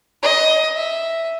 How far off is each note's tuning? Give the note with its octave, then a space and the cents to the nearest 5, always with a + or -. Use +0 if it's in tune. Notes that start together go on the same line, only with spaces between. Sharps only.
D#5 +20
E5 +0